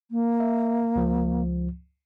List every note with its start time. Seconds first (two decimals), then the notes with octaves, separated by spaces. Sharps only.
0.11 A#3
0.40 E5
0.96 C#2 F3